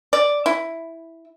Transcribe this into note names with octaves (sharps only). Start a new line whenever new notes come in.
D5
E4